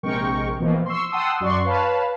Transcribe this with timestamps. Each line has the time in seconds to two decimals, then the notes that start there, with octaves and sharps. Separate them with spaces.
0.03 A#1 C3 G#3 A#4 G5 C#6
0.60 B2 E3 F3 A#3 C4
0.86 C6 C#6 E6
1.11 F#5 G5 A5 C6 D#6 E6
1.40 F#2 F#4 D5 C6 C#6
1.64 B4 C#5 F5 A5 B5